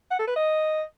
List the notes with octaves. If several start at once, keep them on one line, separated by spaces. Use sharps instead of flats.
F#5
A4
B4
D#5